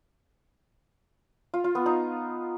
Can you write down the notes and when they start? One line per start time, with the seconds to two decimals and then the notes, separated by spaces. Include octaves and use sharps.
1.54 F4
1.64 F4
1.75 B3
1.86 D#4